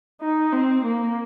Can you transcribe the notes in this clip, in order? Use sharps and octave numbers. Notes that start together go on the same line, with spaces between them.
D#4
C4
A#3